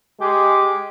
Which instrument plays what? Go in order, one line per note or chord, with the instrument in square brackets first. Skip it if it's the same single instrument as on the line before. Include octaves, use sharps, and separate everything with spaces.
[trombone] G#3 [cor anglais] G4